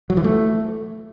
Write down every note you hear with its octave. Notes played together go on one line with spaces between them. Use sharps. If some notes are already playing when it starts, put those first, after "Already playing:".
F#3
E3
A3